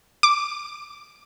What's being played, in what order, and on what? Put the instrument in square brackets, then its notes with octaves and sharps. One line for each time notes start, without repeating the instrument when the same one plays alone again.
[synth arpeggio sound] D6